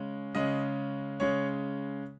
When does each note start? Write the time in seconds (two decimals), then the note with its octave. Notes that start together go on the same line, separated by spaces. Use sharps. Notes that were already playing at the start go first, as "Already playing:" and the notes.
Already playing: C#3 G#3 C#4
0.35 C#3 G#3 C#4 D#5
1.20 C#3 G#3 C#4 C#5